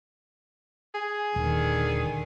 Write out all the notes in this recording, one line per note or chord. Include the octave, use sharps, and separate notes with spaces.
G#4
D#1 D3 D#3